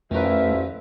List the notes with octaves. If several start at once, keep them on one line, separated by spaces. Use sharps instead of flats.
A1 F2 D#3 F3 A3 A#4 B4 E5